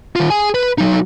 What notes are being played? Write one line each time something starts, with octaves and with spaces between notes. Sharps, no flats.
D#3 F4
G#4 G#5
B4
F#3 D#4